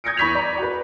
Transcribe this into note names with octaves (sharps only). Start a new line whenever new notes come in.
D#6 G6 G#6 A#6 C#7 D7
E2 B5 C#6 B6 D#7 F7
D5 A#5 B5 C#6
F#4 B4